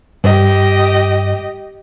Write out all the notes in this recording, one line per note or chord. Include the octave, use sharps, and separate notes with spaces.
G2 G4 D#5